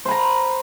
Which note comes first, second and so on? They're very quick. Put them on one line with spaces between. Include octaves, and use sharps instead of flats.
C5 B5 A#5